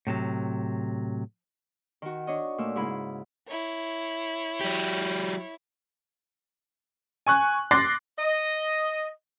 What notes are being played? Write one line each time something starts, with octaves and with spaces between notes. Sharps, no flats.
A2 C3 F#3
D#3 F#4
D4 C#5 D#5
A#2 A3 E6
G#2 C#3 E4 B5
E4 C#5
F#3 G4
G#5 C#6 F#6
C6 D6 F#6 A6 A#6 C7
D#5